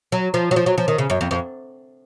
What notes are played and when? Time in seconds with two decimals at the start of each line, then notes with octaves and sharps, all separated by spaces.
0.12 F#3
0.34 F3
0.51 F#3
0.56 F3
0.66 F#3
0.78 F3
0.88 D#3
0.98 C#3
1.10 F#2
1.21 F2
1.31 F2